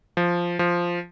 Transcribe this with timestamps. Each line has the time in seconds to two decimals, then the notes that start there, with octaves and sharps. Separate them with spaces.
0.17 F3
0.59 F3